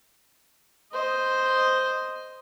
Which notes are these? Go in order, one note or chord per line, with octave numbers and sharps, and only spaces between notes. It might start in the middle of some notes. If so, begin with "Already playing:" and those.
C5 D#5